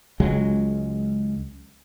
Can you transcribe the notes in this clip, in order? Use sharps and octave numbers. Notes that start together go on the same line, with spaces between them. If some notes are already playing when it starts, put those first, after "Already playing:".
C#2 F#3 G#3